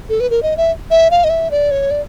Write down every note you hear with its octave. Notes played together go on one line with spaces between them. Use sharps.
A4
B4
A#4
D#5
E5
E5
F5
D#5
E5
D5
C#5
D5